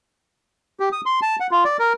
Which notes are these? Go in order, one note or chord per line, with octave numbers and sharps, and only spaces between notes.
G4
D#6
C6
A5
F#5
F4
D5
A#4